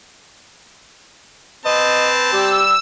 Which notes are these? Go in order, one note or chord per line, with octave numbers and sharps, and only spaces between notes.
C4 B4 D#5 A5
G3 G4 E6